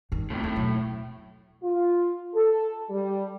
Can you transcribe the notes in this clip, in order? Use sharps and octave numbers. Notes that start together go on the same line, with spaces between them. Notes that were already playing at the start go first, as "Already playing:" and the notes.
G2 D#3
A2 C3
D#2 A2
B2 F#3
F4
A4
G3